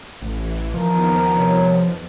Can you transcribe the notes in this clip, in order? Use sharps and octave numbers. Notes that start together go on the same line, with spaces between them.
A1 E3
D#2 D#3 F3 B3 A#4
F2 C3 C#5